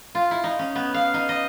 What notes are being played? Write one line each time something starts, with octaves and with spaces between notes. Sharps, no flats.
F4
E4
D#4
C#4
B3
F5
D#4
D#5